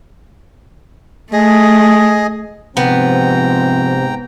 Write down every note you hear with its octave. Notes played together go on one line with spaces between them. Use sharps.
A3 G#4 D#5
G#2 C3 F3 B3 C4 G5 A#5